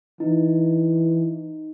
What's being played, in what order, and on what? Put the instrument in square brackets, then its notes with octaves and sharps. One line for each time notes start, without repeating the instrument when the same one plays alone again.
[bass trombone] E3 [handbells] D#4